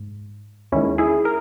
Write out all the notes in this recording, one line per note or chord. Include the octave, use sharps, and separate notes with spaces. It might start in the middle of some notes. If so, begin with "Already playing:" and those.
Already playing: G#2
D#2 D#3 G#3 C#4 E4
E4 G#4
A#4